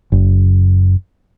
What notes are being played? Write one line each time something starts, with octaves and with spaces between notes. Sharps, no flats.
F#1